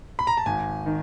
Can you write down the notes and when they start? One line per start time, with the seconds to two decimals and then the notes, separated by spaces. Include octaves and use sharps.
0.19 B5
0.27 A#5
0.37 A5
0.46 G#1 G#5
0.86 D#3